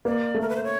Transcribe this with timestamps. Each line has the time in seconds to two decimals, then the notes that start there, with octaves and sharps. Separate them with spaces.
0.05 A#3 D5
0.34 A3
0.41 A#4
0.49 B4
0.56 C5
0.64 C#5